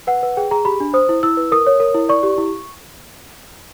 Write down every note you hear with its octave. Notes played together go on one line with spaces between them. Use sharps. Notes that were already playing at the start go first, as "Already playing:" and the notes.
B4 F#5
B4
G#4 G5
G#4 A#5
G4 B5
D4
C5 D#6
E4
E4 E6
B4
A#4 D#6
C#5
A#4
E4
D5 C#6
G4
E4